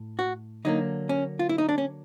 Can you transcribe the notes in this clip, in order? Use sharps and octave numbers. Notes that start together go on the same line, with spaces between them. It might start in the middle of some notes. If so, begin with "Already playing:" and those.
Already playing: A2
F#4
D3 F#3 A#3 D#4
C#4
F4
E4
D#4
D4
C#4